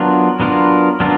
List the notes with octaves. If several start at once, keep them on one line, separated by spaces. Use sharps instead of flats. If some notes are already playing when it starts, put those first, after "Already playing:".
Already playing: F#3 B3 D4 F4 A#4
F#3 B3 D4 F4 A#4
F#3 B3 D4 F4 A#4